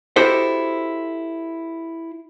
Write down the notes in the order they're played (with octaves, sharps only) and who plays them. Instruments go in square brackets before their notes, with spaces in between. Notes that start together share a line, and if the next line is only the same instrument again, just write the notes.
[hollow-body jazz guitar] E4 F#4 G4 A4 C5 D#5